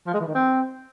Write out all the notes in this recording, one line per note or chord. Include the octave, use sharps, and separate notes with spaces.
F3
G#3
E3
D#3
C4